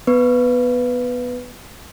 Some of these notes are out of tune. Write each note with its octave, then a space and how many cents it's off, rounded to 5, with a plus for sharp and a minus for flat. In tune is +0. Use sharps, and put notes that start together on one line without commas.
B3 +0 B4 +0